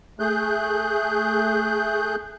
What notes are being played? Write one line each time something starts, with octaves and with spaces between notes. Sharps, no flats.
A3 G#4 F#6 G6